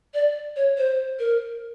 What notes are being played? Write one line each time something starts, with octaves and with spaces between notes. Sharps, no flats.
D5
C#5
C5
A#4